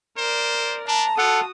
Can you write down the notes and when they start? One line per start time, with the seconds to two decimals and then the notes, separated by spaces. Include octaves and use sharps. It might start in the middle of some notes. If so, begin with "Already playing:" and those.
0.18 A#4 C5 D5
0.88 D4 A5 A#5
1.18 F4 F#4 A4 F#5 D#6